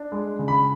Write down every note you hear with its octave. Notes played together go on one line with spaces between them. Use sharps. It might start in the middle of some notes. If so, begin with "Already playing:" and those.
Already playing: D4
G#3
C#3
B5